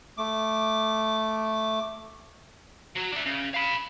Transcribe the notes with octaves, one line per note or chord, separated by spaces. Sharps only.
A3 D6
F#3 F#4
D4 E5
C#3
F5 B5